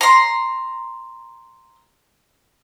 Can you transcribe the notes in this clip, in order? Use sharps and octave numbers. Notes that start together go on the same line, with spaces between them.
A#5 C6